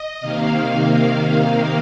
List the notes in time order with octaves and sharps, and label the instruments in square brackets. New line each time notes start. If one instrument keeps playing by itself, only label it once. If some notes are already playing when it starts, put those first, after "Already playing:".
Already playing: [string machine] D#5
C3 D#3 A#3 F5